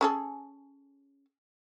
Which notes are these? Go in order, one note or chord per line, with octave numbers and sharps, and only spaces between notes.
C#4 G#4 A4